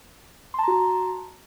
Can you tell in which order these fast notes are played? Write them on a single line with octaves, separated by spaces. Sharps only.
C6 A5 A#5 F#4